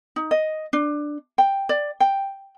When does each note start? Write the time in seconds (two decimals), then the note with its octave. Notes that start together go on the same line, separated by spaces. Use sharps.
0.16 D#4
0.31 D#5
0.73 D4
1.38 G5
1.69 D5
2.00 G5